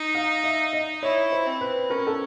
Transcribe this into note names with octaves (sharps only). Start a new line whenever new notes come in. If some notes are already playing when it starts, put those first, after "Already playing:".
Already playing: D#4
F5
E5
D#5
E4 C#5
C5
C4
B4
C#4 A#4
A4